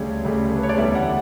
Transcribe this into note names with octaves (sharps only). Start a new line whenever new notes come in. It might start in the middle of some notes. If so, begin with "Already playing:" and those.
Already playing: D2 C#3 G3 C#5
D2 C#3 G3
A4
B4
C#5
D5
E2 D3 G3 E5
F#5